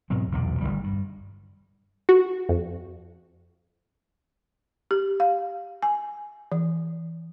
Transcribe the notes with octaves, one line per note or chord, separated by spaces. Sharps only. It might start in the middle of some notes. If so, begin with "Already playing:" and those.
G#2 B2 F#3 C4
B1 E2 A#2 D3
G#1 D#2 D3 G3
G2
F#4
F2
G4
F5
G#5
E3